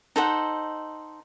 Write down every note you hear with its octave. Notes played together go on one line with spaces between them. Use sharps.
D#4 A4 C5 F#5